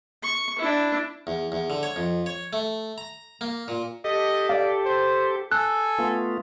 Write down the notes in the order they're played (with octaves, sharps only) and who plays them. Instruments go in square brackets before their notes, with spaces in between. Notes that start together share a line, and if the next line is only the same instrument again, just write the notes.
[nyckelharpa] C#6
D4 E4
[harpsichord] E2
E2
D3
C#5
F2
C#5
A3
A#5
A#3
A#2
[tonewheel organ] G4 A4 [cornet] D#5
[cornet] D5 [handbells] F5
[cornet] C5
[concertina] A4 [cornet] G#5 [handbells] F#6
[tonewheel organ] A3 B3 F4